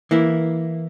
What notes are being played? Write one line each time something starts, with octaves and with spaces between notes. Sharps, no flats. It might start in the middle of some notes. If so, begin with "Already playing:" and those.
E3 A#3 E4